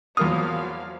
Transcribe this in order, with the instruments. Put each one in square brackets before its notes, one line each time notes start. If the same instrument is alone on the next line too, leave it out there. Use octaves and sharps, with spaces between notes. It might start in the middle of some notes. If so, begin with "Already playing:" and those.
[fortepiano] E2 A#3 F6 [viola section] F3 F#3 F5 [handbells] D#6